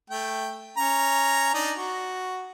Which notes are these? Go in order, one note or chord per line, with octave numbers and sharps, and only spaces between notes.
A3 G5
C#4 A#5
D4 D#4
F#4